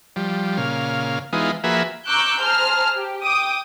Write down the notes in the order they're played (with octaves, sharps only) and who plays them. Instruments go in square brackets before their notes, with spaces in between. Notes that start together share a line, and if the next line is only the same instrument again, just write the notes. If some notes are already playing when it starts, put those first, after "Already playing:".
[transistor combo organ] F3 G3
A#2 C#3 F5
E3 G#3 B3 D#4 F4
F3 A#3 F#4 G#4 B4 E5
[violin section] A#5 C#6 D6 E6 F#6 G6
G#4 C5 A5 A#5 F6
G4
G5 D6 D#6